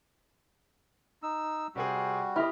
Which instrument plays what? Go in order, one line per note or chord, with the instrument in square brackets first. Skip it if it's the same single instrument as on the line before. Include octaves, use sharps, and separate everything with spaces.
[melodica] D#4 E6
[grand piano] C3 C4 G#4 [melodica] G3 F#4
[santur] E4 D#5 [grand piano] G4 F6